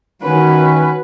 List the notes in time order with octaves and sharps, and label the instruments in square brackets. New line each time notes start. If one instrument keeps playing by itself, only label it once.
[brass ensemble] D#3 C#4 [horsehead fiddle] F#4 B4